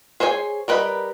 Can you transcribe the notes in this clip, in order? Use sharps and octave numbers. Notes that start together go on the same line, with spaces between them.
G#4 C5 C#5 D#5 G#5
G3 A#4 B4 D#5 B5